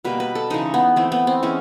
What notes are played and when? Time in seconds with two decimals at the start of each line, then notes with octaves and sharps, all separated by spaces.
0.04 B2 G3 A#3 B4
0.20 B4
0.35 A4
0.50 C#3 E3 G#3 D#4
0.74 B3
0.96 E3 A3 C4
1.12 B3
1.27 C4
1.42 E3 G#3 B3 C#4